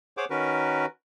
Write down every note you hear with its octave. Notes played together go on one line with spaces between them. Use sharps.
G#4 C5 C#5 F#5 D6
D#3 C#4 F#4 A#4 B4